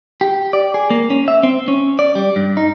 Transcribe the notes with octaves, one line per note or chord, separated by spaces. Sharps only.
G4
D5
G#4
A#3
C#4
E5
C4
C#4
D5
G3
G2
D#4